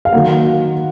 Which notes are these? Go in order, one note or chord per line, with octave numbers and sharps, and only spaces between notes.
F5
D#3 F#3 A#3 F#5